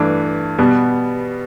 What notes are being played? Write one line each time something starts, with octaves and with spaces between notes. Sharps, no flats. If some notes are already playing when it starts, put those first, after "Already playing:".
Already playing: G2 E3 A3 D4
B2 G3 B3